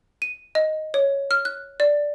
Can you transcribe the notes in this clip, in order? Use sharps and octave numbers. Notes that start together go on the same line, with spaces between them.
D#7
D#5
C#5
F6
F#6
D5